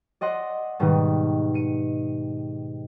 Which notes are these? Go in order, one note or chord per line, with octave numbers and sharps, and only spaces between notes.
D5 D#5 F#5 C6
G#2 B2 D#3 G3 D#6
C#7 D#7